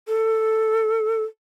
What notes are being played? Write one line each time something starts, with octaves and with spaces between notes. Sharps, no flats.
A4